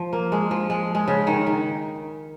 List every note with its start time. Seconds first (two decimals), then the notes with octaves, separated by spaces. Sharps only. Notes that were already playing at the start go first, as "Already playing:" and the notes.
Already playing: F3
0.13 A#3
0.32 G#3
0.51 F3
0.70 G#3
0.95 G#3
1.08 C#3
1.27 D#3
1.47 D#3